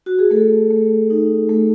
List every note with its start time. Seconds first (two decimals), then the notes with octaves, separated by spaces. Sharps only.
0.06 F#4
0.19 G#4
0.31 A3 A4
0.70 A3
1.10 D#4
1.49 A3